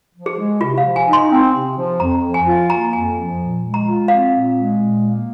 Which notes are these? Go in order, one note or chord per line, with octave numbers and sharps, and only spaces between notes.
F3
G#4
G#3
C3 F4
F5
F3
G#5
D#4
C6
C4
C3
F3
F2 A#5
F3
G#5
F4
A#3 A#5
F2 G#5
F3
A#2
G#3
A#5
F4
C4 F5
A#2
G#3
A#2
A#3